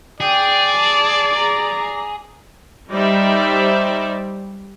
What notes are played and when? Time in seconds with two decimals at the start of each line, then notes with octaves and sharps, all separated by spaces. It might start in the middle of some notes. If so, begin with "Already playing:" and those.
0.20 G#4 D5 G5
0.76 A5
1.33 A#5
2.89 G3 D#4 C5 D5 E5